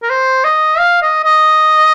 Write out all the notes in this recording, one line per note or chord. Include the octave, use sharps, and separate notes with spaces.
A#4
C5
D#5
F5
D#5
D#5